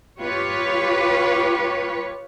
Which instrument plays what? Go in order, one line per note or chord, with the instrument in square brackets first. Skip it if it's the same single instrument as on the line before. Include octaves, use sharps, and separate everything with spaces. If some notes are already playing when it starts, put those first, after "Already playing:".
[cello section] F4 G4 B4 C#5